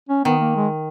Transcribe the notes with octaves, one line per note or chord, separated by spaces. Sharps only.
C#4
D#3 B3
A#3
G#3